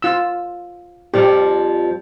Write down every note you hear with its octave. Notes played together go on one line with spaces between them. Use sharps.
F4 E6
F2 F3 G3 G4